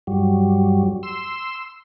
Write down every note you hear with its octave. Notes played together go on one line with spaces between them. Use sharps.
G2 F#3 G3
C6 E6